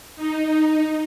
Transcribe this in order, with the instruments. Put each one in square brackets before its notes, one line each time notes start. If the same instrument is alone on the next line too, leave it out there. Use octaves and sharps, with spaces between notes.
[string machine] D#4